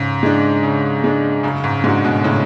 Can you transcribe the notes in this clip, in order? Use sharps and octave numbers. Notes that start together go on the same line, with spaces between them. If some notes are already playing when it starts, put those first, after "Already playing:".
Already playing: G#2 C#3
G#3 D4
C#3
G#3 D4
F#2 C#3
G#2
G#2 G#3 D4 F#4
G#2 B2
A2 C#3